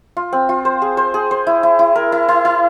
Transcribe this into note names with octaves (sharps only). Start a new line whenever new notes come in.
F4
C4
F4
C5
G#4
C5
G#4
C5
E4
E4
E4
A#4
E4
E4
E4